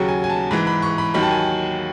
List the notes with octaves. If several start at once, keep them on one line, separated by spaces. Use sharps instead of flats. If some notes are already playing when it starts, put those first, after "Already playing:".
Already playing: D#2 C#3 F#3 F#5
G#5
G#5
A5
G#2 E3 B5
B5
C#6
B5
D#2 D#3 F#3 B5
A5
G#5